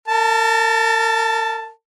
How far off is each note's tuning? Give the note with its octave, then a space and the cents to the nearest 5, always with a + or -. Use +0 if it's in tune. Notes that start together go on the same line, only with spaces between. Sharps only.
A#4 -40 A5 +0